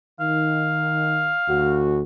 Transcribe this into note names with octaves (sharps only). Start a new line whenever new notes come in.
D#3 F5
D2 F#4